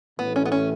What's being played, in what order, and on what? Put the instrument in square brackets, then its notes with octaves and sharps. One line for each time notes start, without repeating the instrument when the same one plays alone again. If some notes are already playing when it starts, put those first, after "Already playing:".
[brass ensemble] A1 A2 E3 [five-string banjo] B3
[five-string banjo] C#4
B3
C#4